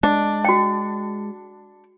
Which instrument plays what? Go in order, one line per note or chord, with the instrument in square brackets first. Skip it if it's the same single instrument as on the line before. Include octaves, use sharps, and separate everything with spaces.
[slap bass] G#3 [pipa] D4
[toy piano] F#4 G5